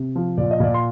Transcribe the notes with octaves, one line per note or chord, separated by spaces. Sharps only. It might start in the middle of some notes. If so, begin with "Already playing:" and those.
Already playing: C3
F3
A#2 D5
D#5
A#2 D5
C6